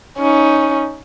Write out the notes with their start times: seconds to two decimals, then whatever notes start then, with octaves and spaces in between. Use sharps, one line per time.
0.19 C#4 D#4